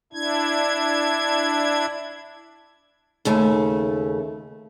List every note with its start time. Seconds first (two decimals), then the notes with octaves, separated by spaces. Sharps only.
0.13 D4 E4 G#6
3.25 D#2 C#3 A3